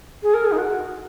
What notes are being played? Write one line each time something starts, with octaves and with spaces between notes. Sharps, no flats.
G#4
A#4
G#4
D#4
F#4